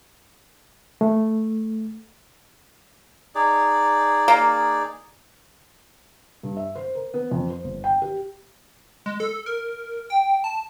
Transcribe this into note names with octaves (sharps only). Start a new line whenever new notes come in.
A3
D#4 G#4 D5
A#3
G2
E5
C5
A#4
B3
F2
C5
G1
G5
G4
G#3
A4
A#4
G5
A5